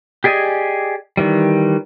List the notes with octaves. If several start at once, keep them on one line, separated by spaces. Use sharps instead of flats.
G4 G#4 D5 D#5 G#5
D#3 E3 G3